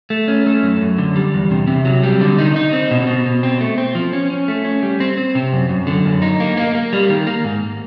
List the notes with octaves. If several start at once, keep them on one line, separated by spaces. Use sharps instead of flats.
A3
C#4
A3
F#2
F#2
D3
G3
E2
C3
C3
F#3
G3
D3
D#4
D#4
C4
B2
B2
B2
C4
A3
C4
F3
C#4
C#4
A3
C#4
G3
C4
C4
C3
F#2
F#2
D3
F#2
D#4
A#3
A#3
A#3
G3
D#3
A#3
G#2